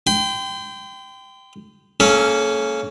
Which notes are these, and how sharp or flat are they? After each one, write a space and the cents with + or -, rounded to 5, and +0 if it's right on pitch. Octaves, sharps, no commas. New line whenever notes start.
G5 +0 C6 -40
A#3 -25 C#4 +0 A4 -40